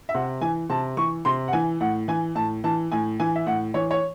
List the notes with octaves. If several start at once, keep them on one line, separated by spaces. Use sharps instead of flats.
E5
C3 F#5
E3 G#5
C3 A5
E3 C#6
C3 C6
F#5
E3 G#5
A2 F#5
E3 G#5
A2 A5
E3 A5
A2 G#5
E3 G#5
E5
A2 F#5
E3 C#5
C#5